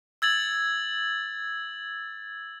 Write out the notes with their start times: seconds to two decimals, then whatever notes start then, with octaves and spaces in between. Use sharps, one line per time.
0.22 E6 G#6 A6 F#7